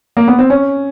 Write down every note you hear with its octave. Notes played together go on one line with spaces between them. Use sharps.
A#3
B3
C4
C#4